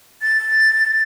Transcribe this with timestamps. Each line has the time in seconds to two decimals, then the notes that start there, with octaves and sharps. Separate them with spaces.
0.22 A6